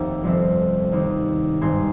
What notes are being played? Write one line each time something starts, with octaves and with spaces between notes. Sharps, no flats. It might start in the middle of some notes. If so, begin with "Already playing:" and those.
Already playing: F1 D#2 D#3
G1 F2 C3 F3
D#2 D#3
G#1 G2 D#3 G#5 C6